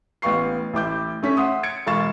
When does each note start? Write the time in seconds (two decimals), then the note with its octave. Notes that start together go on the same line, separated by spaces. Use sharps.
0.22 A1 B3 F5 C#6 C7
0.74 A1 E4 D6 G6
1.23 A3 C#4 B6
1.37 E5 F#5 C6 D#6
1.63 G#6 A6 C#7 D7
1.86 E1 F5 C#6 A6 E7